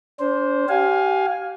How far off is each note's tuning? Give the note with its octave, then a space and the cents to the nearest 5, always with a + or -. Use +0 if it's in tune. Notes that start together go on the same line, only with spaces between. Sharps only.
D4 -45 C5 +0
G4 -30 F5 +15 G#5 +0